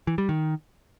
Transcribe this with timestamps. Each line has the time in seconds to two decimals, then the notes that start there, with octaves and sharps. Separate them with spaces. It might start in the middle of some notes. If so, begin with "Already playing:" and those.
0.07 E3
0.18 G3
0.29 D#3